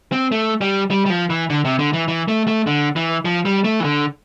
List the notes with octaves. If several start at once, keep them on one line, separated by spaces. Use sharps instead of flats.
C4
A3
G3
G3
G3
F3
E3
D3
C3
D3
E3
E3
A3
A3
D3
E3
F3
G3
A3
E3
D3